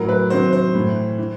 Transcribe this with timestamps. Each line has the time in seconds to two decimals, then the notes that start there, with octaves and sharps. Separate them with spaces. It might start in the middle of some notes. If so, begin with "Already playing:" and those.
Already playing: A2 F#3 A#4
0.09 B4
0.30 C3 D#3 F#3 C5
0.53 C5
0.74 A2 E3
1.18 E3